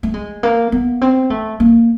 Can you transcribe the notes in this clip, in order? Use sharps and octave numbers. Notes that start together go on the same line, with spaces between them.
A3
G#3
A#3
B3
C4
A3
A#3